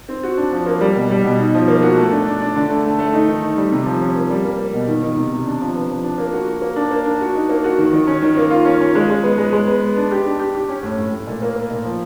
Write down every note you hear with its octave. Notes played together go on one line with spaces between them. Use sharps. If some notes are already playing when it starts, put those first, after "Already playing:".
C4
F#4
D4
F3
A#3
G3
B2
G3
B2
D#4
F3
A#3
F#4
A3
D4
D4
D4
D3
A3
A3
A3
D#4
D#3
D#4
G3
C3
F3
C#4
A#3
G3
A#3
A#3
B2
D#3
D#3
C3
C3
D4
F3
B3
F3
D4
A#3
F#4
F#4
A#3
D4
A#3
D4
F#4
D#4
A#3
F#4
D#3
D#3
C#4
D#3
A#3
F4
C#4
C#4
G#3
G#3
B3
G#3
G#3
B3
B3
D4
G4
D4
G4
G4
C#4
A2
A2
A2
A#2
A#3
A#3
A#2
F3